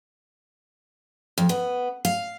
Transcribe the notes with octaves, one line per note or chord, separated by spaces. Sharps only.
F2
B3
F5